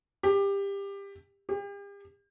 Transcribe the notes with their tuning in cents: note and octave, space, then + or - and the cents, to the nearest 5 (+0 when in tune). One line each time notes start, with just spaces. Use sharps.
G4 +20
G4 +40